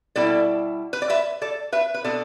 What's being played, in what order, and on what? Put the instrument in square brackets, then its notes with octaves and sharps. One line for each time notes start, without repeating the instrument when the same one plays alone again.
[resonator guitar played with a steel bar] B2 G3 E4 A4 D5
B4
D5
B4 E5
A4 D5
B4 E5
B4
B2 B3 D4 A4 D5